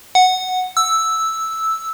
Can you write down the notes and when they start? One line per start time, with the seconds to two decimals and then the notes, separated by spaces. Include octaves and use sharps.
0.15 F#5
0.77 E6